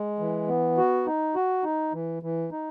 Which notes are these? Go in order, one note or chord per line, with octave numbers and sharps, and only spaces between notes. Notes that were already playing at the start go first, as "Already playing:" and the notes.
Already playing: G#3
E3
B3
F#4
D#4
F#4
D#4
E3
E3
D#4